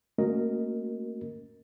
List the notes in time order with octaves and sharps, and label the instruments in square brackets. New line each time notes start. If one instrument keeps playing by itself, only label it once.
[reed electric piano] A3 A#3 C#4 F#4 A#4 D#5